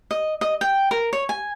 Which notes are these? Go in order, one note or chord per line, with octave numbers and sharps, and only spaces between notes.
D#5
D#5
G5
A#4
C#5
G#5